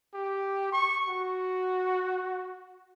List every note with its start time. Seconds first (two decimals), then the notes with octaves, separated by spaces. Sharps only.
0.14 G4
0.73 C#6
1.09 F#4